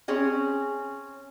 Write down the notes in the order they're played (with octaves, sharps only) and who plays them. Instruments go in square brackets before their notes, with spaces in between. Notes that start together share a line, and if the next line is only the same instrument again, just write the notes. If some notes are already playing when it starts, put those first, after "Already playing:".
[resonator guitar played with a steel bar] C4 C#4 G#4